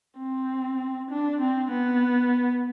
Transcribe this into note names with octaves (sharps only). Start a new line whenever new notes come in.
C4
D4
C4
B3